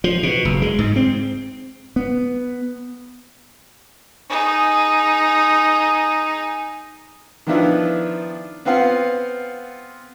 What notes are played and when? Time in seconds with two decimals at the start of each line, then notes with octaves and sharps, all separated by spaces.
0.04 F3
0.23 B2
0.45 F#1
0.62 G#3
0.79 G#2
0.96 C4
1.96 B3
4.29 D#4 G#4
7.47 D#3 F3 B3 D4 E4 F4
8.65 B3 C4 F4 F5 F#5